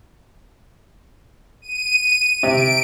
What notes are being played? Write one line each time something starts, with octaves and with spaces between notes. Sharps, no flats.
D#7
C3 D7